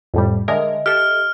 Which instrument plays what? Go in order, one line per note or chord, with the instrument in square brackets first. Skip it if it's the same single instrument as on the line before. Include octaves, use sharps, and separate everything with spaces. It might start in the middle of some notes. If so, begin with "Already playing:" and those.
[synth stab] F2 A2 G3
[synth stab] D3 G#3 A#4 [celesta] D#5 E5
[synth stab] G4 A4 [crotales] F6